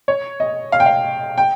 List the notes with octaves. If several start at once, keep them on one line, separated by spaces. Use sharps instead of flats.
C#5
D#5
F5
G5
F5
G5